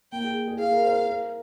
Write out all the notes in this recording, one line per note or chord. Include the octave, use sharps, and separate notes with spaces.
A#3 G5
G#4
G#4
G#4 F5
A#4
C5
A#4
A#4